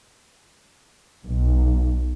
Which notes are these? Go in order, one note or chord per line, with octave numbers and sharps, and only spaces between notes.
B1